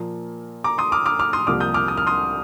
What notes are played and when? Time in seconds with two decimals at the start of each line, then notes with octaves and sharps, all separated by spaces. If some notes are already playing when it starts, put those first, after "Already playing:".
Already playing: A#2 F3 A#3
0.64 A#5 D6
0.78 C6 D#6
0.92 D6 F6
1.06 D6 F6
1.19 D6 F6
1.33 C6 D#6
1.47 C2 C3 F3 A#3 D6 F6
1.60 D#6 G6
1.74 D6 F6
1.88 D#6
1.97 F6
2.07 C6 D#6